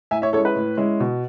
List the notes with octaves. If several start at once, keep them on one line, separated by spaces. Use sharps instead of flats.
A2 E5 G#5
C#5 E5
G#3 C#4 E4 A4 C#5
B4
A2
G#3 C#4 E4
B2